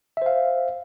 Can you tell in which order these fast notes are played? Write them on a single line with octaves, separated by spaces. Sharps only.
E5 C5 F5